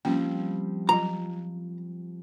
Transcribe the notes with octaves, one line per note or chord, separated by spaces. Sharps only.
F3 G3 A#3 C4 C#4 G5
F#3 F4 A#5